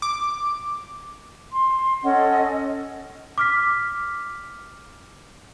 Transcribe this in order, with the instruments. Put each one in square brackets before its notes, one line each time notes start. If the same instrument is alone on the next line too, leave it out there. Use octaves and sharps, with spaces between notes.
[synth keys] D6
[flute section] C6
C#4 A4 D#5 F#5
[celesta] D6 F6 B6